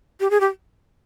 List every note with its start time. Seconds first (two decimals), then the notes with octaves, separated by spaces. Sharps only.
0.20 G4
0.30 G#4
0.40 G4